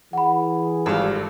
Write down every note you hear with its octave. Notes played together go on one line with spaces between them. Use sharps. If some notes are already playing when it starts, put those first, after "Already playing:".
E3 G#4 F#5 B5
G#1 G2 F4 A4